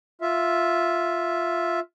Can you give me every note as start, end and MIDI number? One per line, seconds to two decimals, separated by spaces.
0.21 1.80 65
0.21 1.80 76